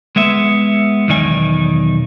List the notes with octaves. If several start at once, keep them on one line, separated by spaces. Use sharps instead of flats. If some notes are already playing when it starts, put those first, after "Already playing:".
G#3 B3 E5
B1 E2 D#3 D#4 D5 G#5